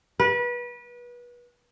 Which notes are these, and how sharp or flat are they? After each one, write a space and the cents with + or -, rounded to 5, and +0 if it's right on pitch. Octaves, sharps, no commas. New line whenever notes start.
B4 -30